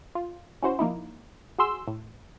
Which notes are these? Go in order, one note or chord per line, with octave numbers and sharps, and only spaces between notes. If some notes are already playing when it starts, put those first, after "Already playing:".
F4
C#4 E4 F#4 C5
F3 A#3 D#4 E4
F#4 G#4 C6 E6
A2